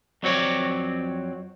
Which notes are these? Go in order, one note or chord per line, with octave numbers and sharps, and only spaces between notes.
F2 F#3 C4 C#5 D5